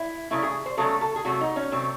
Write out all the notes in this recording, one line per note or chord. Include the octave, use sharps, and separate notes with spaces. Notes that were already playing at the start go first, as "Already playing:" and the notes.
Already playing: E4
C#3 F#3 A3 E4
G#4
C5
C#3 F#3 A3 A4
A4
G#4
C3 F#3 A3 F#4
D#4
C#4
C3 F#3 A3 C4